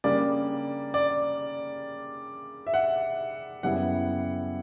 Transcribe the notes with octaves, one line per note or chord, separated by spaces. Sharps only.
C#3 G3 A#3 D4 D5
D5
E5
F#5
F#2 C#3 G3 B3 E4 F#5